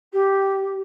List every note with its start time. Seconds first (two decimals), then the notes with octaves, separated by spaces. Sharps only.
0.13 G4